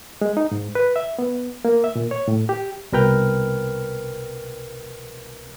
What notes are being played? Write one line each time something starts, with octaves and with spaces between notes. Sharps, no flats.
G#3
D#4
G#2
B4
E5
B3
A#3
E5
A#2
C#5
A2
G4
C2 B2 A#4 B4 G5 F6